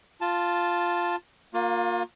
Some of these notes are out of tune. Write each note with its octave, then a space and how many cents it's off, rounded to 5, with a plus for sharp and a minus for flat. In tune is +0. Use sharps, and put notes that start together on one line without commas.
F4 +0 A5 +0
A#3 +0 F4 +35